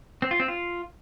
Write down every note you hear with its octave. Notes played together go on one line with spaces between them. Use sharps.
C4
F4
C4
F4